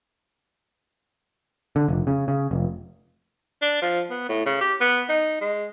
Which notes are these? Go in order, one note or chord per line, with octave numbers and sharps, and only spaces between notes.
D3
F1
C#3
C#3
F1
D4
F3
B3
A2
C#3
G4
B3
D#4
G#3